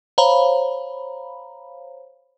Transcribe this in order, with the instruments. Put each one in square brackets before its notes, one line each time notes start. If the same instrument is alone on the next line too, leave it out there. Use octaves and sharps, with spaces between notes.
[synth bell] C5 C#5 F5 A#5 B5